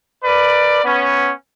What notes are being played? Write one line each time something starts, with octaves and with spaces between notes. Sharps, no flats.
A#4 B4 D5
B3 C#4